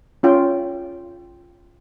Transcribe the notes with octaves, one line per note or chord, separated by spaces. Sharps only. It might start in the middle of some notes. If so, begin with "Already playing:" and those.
C#4 F4 G5